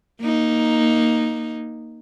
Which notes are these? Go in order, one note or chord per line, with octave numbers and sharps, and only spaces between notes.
A#3 D#4